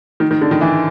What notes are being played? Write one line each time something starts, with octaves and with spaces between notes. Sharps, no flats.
D#3
D#3
D3
D#3
E3